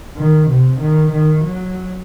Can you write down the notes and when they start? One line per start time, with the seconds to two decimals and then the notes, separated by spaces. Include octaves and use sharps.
0.17 D#3
0.50 C3
0.81 D#3
1.12 D#3
1.45 F#3